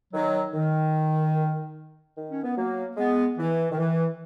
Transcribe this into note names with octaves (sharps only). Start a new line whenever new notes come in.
D#3 F#3
D#3
D#3
C#4
B3
F#3 A#3
G#3 B3
E3
D#3
E3